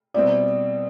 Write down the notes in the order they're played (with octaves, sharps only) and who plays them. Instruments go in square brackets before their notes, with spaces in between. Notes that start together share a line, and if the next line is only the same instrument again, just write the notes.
[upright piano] B2 G3 C4 E4 [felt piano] D5